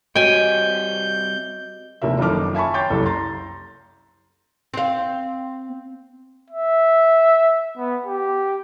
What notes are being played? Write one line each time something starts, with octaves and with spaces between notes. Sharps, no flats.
G3 C4 F#4 C#5 D#5 G5 G#5 G6
F1 D#2 C3 A#4 E5
F#1 D#3 F3 A4 D6 F6
E5 G#5 A5 B5 C#6
C#5 G5 C6 D6 G6 A6
F#1 C2 A4
A#5 C6 A6
C4 F5
E5
B3
G4